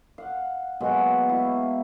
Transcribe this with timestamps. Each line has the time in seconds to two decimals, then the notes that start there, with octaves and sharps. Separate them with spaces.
0.18 F5 F#5
0.80 B2 F#3 G#3 A#3
1.29 E4 F5 C#6